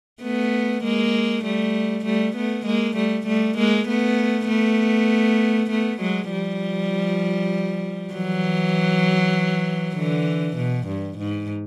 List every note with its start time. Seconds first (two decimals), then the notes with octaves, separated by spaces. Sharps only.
0.23 A3 B3
0.84 G#3 A#3
1.45 G3 A3
2.05 G3 A3
2.36 A3 B3
2.66 G#3 A#3
2.97 G3 A3
3.27 G3 A3
3.58 G#3 A#3
3.88 A3 B3
4.49 A3 B3
5.70 A3 B3
6.01 F#3 G#3
6.31 F3 G3
8.14 E3 F#3
9.96 D3 E3
10.57 B2
10.87 G2
11.18 G#2